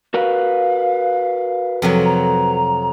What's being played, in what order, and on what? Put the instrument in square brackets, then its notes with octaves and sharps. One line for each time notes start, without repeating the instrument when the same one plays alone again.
[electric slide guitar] F#4 A#4 B4 [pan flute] F5
[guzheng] F2 C3 F#3
[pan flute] A#5